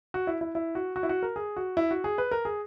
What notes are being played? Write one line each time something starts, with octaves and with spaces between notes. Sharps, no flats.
F#4
E4
E4
E4
F#4
F#4
E4
F#4
A#4
G#4
F#4
E4
F#4
G#4
B4
A#4
G#4